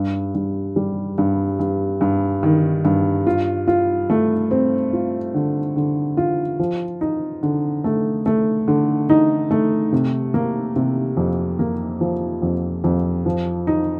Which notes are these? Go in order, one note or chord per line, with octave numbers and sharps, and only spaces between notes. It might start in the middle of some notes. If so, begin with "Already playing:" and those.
Already playing: G2
G2
G3
G2
G2
G2
D#3
G2
F4
F4
A3
C4
F4
D3
D3
F4
F3
D#4
D3
A3
A3
D3
D#4
A3
C3
A#3
C3
F2
A#3
F3
F2
F2
F3
D#4